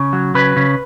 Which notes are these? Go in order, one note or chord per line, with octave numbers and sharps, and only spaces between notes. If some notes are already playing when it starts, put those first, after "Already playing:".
Already playing: C#3
F#3
C#3 B4
C#3